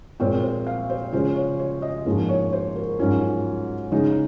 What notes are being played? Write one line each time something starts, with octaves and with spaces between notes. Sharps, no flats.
A#2 G#3 C4 F4 C#5
C5
F5
C5
C#3 G#3 C#4 F4 C5
C#5
C#5
D#5
G#2 F3 A#3 C#4
C#5
C5
A#4
G#2 F#3 C#4 F4
C#3 G#3 D#4